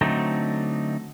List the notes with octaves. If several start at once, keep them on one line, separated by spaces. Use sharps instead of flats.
D3 F#3 A3 C4 D#4